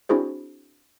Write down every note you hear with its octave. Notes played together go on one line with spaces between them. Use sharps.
C4 D4 E4 F#4 G#4 C5